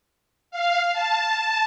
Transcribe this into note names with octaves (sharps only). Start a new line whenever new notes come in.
F5
A5